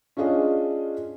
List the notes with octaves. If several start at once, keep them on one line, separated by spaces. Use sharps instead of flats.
C#4 D4 F4 G#4 D#5